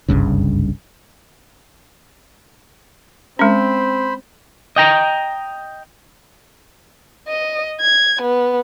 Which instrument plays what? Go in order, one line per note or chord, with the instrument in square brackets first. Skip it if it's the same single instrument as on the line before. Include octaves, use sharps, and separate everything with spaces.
[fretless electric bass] F#1 C2 G2 C#3
[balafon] G#3 C#4 [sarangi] C4 [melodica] C5 B5
[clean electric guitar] D#5 G5 A#5
[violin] D#5
G#6
B3